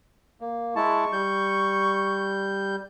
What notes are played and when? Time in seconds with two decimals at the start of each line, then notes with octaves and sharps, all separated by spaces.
0.41 A#3
0.76 G#3 E4 A5 C#6
1.13 G3 G6